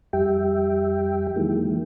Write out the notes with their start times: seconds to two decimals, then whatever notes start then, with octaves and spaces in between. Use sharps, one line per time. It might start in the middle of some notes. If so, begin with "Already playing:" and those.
0.13 F2 G3 G4 E5 G5
1.36 D#3 E3 F#3 G#3 A#3